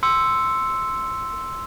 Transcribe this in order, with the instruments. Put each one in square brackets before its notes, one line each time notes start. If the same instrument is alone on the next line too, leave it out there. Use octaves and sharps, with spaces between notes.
[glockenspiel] C6 E6 C#7